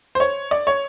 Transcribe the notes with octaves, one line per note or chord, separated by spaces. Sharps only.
C5
C#5
D5
C#5